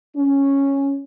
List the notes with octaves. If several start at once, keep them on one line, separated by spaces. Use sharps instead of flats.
C#4